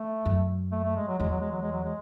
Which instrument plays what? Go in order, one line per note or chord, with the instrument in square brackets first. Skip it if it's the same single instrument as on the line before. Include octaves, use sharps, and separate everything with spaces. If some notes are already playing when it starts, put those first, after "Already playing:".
Already playing: [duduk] A3
[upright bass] F#2
[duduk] A3
A3
G#3
F#3
[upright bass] E2 [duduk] G#3
[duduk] F#3
G#3
F#3
G#3
F#3
G#3